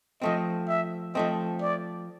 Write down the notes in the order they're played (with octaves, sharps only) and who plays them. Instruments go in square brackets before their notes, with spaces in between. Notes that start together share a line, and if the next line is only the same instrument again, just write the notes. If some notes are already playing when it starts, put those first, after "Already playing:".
[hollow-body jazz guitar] F3 A3 C4 [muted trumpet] D#5
[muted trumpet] E5
[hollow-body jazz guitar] F3 A3 C4 [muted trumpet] D#5
[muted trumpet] D5